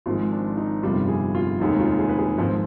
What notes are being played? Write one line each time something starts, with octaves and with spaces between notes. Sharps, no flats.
G#1 G#2 F3 G#3 F4
D4
D#4
G1 F2 C3 D#3 G3 F4
G#4
F4
F1 D#2 D#3 G#3 D#4
F4
G#4
B4
G#4
G#1 G#2 F3